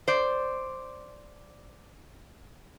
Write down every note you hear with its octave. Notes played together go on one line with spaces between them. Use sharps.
C5 D5